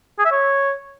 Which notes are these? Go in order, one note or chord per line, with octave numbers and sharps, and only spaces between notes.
G#4
E5
C#5